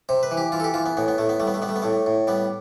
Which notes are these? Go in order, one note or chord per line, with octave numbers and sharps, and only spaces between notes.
C3 C5
B4
E3
G4
E3 F4
A4
G4
E3 F4
B3
A2 B3
B3
A2 A3
B3
G3 A3
B3
A3
G3 B3
A3
B3
A2 A3
A2
G3 B3